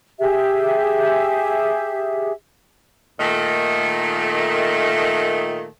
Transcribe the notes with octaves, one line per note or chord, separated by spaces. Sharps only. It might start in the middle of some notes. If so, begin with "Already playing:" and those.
G4 G#4 E5
A#2 D#3 A3